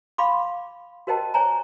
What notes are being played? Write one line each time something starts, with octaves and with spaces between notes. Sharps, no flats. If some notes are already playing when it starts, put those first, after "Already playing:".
F5 B5 C6 D6
F#4 A#4 C5 D#5 G5 A5
C5 C#5 G#5 A#5